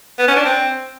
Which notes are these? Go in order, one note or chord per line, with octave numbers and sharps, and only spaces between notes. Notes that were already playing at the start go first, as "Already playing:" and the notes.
B3
C#4
D4
C4